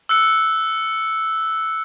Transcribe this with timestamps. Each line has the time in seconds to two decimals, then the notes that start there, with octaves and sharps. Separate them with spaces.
0.09 E6 F#6 C#7